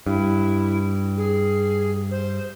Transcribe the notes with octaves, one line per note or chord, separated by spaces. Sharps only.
G2 E4
G#4
C5